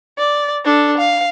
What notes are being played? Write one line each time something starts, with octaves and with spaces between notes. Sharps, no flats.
D5
D4 A4
F5